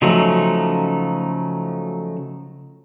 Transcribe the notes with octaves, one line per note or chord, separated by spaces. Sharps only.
C#3 F3 F#3 A3 D#4